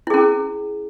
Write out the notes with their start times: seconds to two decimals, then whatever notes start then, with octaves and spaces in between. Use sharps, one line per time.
0.07 E4
0.10 G#4
0.14 C#4